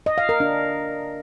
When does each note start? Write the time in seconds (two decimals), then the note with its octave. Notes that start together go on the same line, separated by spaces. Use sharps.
0.06 D#5
0.18 F5
0.29 A#4
0.40 D4